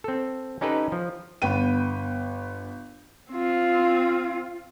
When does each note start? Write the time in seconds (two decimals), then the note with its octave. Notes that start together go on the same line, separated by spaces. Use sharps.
0.04 C4 A4
0.61 C#4 D#4 G4 A4 B4
0.92 F3
1.42 G1 B3 G5 D#7
3.32 C4 F4